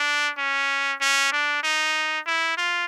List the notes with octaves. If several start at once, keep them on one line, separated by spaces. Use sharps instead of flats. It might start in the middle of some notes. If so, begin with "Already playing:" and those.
Already playing: D4
C#4
C#4
D4
D#4
E4
F4